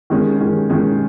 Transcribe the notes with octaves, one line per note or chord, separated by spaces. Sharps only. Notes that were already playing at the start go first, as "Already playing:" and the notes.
D#3 G#3 C#4
D#3 G#3 C#4
D#3 G#3 C#4